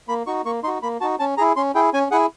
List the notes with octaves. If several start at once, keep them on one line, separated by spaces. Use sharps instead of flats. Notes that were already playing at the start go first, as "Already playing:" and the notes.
A#3 B5
D#4 F#4 C#6
A#3 C#6
D#4 F#4 C6
A#3 B5
D#4 F#4 A5
C#4 A5
E4 G#4 A#5
C#4 C6
E4 G#4 G5
C#4 G#5
E4 G#4 F#5